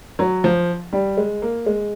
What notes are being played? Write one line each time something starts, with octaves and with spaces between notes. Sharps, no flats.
F#3
F3
G3
G#3
A#3
G#3